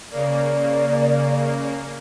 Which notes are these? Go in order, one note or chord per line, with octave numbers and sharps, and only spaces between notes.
C#3 A#3 D5